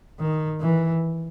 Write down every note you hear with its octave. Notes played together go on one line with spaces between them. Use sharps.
D#3
E3